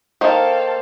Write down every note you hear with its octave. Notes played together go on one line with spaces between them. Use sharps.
D#3 A#3 A4 C5 F5